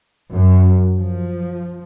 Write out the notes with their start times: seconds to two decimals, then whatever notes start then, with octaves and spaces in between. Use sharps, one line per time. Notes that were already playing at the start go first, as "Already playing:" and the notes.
0.32 F#2
0.98 F3